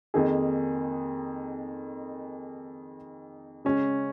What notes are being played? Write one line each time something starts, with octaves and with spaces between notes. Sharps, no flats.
F2 D#3 A#3 D#4 G#4
C#3 G#3 C#4